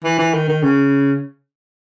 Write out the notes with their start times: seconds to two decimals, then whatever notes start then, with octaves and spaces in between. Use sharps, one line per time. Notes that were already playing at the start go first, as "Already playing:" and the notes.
0.04 E3
0.19 E3
0.34 D#3
0.49 D#3
0.63 C#3